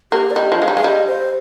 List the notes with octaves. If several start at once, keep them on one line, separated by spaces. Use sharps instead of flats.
A#3 G4
D5
G3 D#5
F3
G#3 F5
G3
G#3 F5
G3 D#5
C5